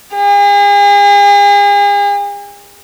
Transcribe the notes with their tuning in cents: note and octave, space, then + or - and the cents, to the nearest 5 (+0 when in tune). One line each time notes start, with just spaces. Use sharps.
G#4 -40